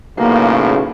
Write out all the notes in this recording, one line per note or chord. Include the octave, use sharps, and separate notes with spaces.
B1 A2 C#3 A#3